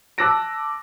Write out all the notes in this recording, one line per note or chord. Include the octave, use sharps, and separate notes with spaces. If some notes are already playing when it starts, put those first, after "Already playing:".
A5 D6 E6 F#6 A#6 D7